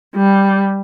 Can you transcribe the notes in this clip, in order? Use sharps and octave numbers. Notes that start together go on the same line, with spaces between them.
G3